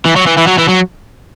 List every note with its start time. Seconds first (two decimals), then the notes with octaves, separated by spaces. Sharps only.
0.05 E3
0.16 F#3
0.27 E3
0.38 E3
0.48 F#3
0.59 E3
0.69 F#3